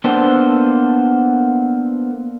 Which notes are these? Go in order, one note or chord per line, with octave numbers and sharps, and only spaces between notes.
A#3 B3 D4 A4 C5